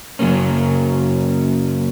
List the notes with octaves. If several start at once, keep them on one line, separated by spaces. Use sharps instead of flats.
F#2 C#3 F#3 A#3 C#4